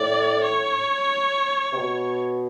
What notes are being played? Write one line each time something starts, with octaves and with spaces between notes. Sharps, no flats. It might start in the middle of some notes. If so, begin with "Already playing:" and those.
Already playing: A2 D5
C#5
C3
B2